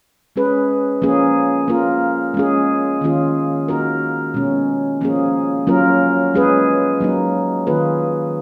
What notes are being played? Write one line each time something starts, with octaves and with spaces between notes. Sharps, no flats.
G#3 C#4 G#4 B4
F3 A#3 C#4 G#4
A#3 F4 A#4
G#3 C#4 G#4
D#3 A#3 C#4 F4 G#4
A#3 D#4 F#4 A#4
B2 G#3 C#4
F3 A#3 C#4 G#4
F#3 A#3 C#4 F4 A#4
G#3 C#4 G#4 B4
F#3 A#3 D#4
D#3 A#3 F4 G#4 B4